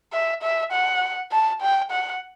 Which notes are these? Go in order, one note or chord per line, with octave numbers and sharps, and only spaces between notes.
E5
E5
F#5
A5
G5
F#5